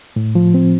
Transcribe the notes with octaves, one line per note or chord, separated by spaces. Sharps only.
A2
F3
C4